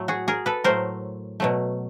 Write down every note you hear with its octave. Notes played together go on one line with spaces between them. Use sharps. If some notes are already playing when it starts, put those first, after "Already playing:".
Already playing: A2 F#3 A3
F#4 G#4
G#4 A#4
A4 B4
A2 F#3 A3 A#4 C5
B2 F#3 A3